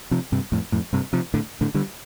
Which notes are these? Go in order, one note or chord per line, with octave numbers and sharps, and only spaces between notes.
C3 F3
G2 C3
F2 A2
F2 A2
G2 C3
C3 F3
A2 D3
A2 D3
D3 G3